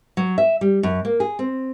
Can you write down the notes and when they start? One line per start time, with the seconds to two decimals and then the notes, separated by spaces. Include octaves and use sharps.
0.17 F#3
0.38 E5
0.61 G3
0.83 F#2
1.05 A#3
1.20 G#4
1.39 C4